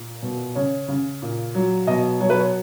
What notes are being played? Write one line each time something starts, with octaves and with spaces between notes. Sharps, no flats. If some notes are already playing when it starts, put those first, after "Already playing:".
Already playing: A#2
B2
C#3 C#5
C#3
A#2
F#3
B2 D#5
F#3 C#5
B4
C#5